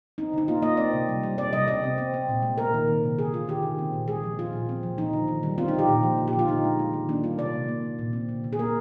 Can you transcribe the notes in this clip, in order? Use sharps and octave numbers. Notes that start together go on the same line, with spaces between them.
C4 D#4
D3 D#4
A#3 F4
A#3 D#5
C4 D5
C3
G3
G3
C3 D5
G3 D#5
C3 D5
C4
C4
C4
A#2
G#3
A#3 A#4
D#3
C3
C3
D3 G#4
D3 F4
D#3 G4
D#3
C4
A#2
G#3 G#4
F3
F3 F4
A#2
C4
F3
F3 D#4
D3
D#3
G3
C4 F4
D#4
D3 G4
A#2
F3
D3
G4
D3
F4
D3 D#4
G#3
G#3
D#3
A#3 D4
G3 F4
C3 D5
A#3
A#3
A#3
A#2
C4
D3
D3
G#4
A#3 A#4